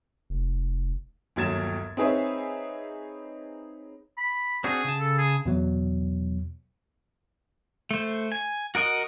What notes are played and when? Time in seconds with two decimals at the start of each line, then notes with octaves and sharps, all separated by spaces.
0.30 F1
1.36 G1 D#2 F#3 G#6 A6 E7
1.97 C4 D#4 G#4 B4 C#5 E5
4.18 B5
4.64 C4 D4 F#4 G#4
4.84 C#3 A5
5.00 A4
5.18 G#4
5.46 E2 B2 F#3
7.91 A3 C5
8.32 G#5
8.75 F#4 A#4 D#5 F#5